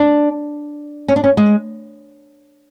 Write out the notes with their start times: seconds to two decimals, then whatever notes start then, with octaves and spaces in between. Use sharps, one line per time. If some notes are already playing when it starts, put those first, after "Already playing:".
Already playing: D4
1.08 C#4
1.16 D4
1.24 C#4
1.37 G#3